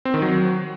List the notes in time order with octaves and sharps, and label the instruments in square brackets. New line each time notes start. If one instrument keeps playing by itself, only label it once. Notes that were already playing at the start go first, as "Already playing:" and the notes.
[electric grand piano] C4
D#3
F#3